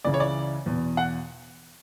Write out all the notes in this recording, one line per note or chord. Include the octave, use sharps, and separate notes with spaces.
C#2 C#3 E3 D5
C#5
D5
E2 B2
F#5